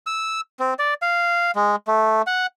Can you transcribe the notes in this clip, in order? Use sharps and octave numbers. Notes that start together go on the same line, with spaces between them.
E6
C4
D5
F5
G#3
A3
F#5